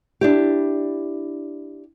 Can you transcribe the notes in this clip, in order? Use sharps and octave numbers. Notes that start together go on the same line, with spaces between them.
D4 E4 G4